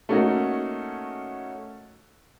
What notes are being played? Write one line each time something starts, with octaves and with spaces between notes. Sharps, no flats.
A3 A#3 C#4 D#4 F#4